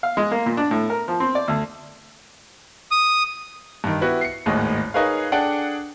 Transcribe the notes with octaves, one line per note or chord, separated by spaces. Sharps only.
F5
G#3
A#3
A#2
D4
A2
A#4
F3
C4
D5
D2
D#6
G2 D#3
B3 E4 F#4 G4 B4
C7 C#7
G#1 D#2 A2 G#3 D#5
D#4 G#4 A#4 B4 C#5 F5
D4 G#4 A4 D5 F#5 G5